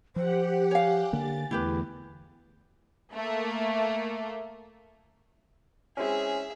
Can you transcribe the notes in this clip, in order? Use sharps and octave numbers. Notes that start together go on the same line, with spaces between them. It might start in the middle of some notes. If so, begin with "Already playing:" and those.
F3 G4 C5 F#5
C#5 F5 G#5
D3 A#3 A6
E2 D3 A3 B3 E4 G4 B4
A3 A#3
G#3 C4 C#4 E4 G#4 E5